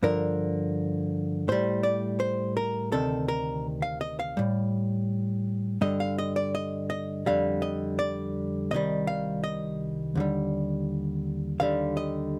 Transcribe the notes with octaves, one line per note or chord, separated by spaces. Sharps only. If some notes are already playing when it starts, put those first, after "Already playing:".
G2 D3 F3 A#4
A2 G3 C5
D5
C5
A#4
D2 C3 D#3 A4
A#4
F5
D#5
F5
A2 G3
G2 D3 G3 D#5
F5
D#5
D5
D#5
D#5
F2 D3 G3 F5
D#5
D5
C2 C3 D#3 G3 D#5
F5
D#5
D#2 D3 G3
D#2 D3 G3 F5
D#5